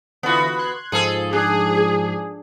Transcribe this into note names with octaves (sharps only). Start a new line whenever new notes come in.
D3 E3 B3 F4 F#4
C6 F#6 G#6
G#2 F3 G#4 A4
D4 G#4